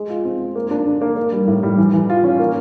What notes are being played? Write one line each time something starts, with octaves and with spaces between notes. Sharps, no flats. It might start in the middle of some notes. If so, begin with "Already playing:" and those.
Already playing: G#3
F4
C4
G#3
A#3
D4
D3
A#3
A#3
G3
A2
G3
E3
E3
F4
C#4
A#3